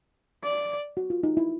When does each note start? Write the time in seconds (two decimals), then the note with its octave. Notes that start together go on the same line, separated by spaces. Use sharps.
0.43 D5
0.97 F#4
1.10 F4
1.23 D#4
1.37 E4